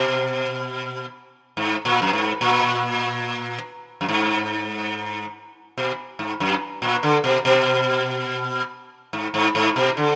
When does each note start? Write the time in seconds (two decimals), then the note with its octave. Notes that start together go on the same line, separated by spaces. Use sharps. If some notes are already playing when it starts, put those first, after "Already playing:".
Already playing: B2
1.57 G#2
1.85 A#2
2.02 F#2
2.13 G#2
2.41 A#2
4.01 F#2
4.09 G#2
5.78 B2
6.19 G#2
6.40 F#2
6.82 A#2
7.03 D3
7.24 B2
7.45 B2
9.13 G#2
9.34 G#2
9.55 G#2
9.76 B2
9.97 D3